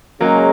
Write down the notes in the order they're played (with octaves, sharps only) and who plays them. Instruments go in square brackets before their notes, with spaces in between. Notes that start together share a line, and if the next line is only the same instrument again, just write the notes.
[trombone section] C#3 G#3 C#4 [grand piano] F#3 A#3